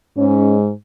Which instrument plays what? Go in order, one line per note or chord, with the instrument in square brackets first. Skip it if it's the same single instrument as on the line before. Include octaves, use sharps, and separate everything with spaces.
[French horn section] G#2 G#3 C#4